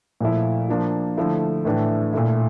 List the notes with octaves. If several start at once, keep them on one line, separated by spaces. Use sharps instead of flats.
A#2 F3 A3 E4
F3 A#3 D4 F4
D3 F3 A3 E4
A2 E3 A3 D4
A#2 A3 E4